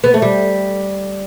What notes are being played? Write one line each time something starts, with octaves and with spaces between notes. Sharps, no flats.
B3
A3
G3